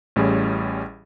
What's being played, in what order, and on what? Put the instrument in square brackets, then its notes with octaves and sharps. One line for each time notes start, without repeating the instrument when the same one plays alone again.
[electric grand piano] A1 A2 G3 C#4 G#4